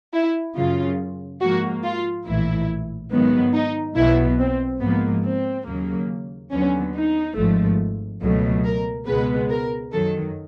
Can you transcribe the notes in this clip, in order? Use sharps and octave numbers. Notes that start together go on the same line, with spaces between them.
E4
F#2 C#3 F#3 F4
G#2 F3 A#3 F#4
F4
A#1 A2 E3 E4
G#2 D#3 F#3 B3
D#4
B1 B2 F#3 B3 E4
C4
G#2 F3 A#3 B3
C4
D#2 C#3 F#3 A#3
D#2 D3 F#3 B3 C#4
D#4
G#1 G#2 F3 A3
C#2 B2 F#3 A3
A#4
C#2 B2 G#3 B3 B4
A#4
F#2 D#3 F#3 A4